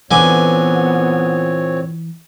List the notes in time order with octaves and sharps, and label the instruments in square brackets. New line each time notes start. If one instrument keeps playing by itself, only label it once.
[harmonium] A#2 C4 C#5 [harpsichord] D3 G#5 D6 [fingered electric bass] E3 [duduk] B3